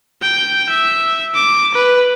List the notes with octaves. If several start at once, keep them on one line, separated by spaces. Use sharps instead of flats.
G5
E5
D6
B4